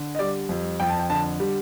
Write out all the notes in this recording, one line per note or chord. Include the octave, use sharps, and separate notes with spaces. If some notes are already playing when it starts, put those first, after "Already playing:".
Already playing: D3
D#5
G3 D5
F2
F2 G5
A5
G5
D3 A5
G3